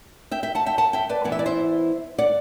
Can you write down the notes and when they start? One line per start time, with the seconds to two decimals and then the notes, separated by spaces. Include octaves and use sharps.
0.31 E5 G5
0.43 E5 G5
0.55 F#5 A5
0.66 E5 G5
0.78 F#5 A5
0.93 E5 G5
1.09 B4 D5
1.24 E3 B3 E4 F#5
1.32 E5
1.39 D5
1.46 C5 E5
2.18 D5 F#5